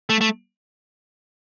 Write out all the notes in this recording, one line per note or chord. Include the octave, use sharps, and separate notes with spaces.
A3
A3